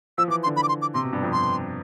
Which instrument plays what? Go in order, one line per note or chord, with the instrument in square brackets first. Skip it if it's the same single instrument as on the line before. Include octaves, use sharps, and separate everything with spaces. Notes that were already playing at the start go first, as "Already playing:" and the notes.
[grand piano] F3 [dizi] E6
[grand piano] E3
[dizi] D6
C6
[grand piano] D3
[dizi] B5
D6
C6
D6
[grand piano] C3 [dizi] C6
[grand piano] B2
G2
F2
[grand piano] G2 [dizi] C6